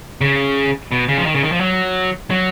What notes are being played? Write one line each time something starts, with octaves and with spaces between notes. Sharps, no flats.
C#3
B2
C#3
F3
D#3
C#3
D#3
F3
F#3
F#3